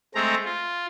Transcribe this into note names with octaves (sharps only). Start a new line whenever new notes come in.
G#3 A3 C4 A#5
F4